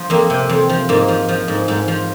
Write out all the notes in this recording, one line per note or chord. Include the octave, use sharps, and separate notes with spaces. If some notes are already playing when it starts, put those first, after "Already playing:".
Already playing: F3
F2 A#3
C3
F2
F3
G#2 A#3
F3
F3
G#2
G#2
F3